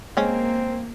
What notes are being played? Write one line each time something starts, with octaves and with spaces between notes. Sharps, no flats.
G#3 A#3 C4 C#4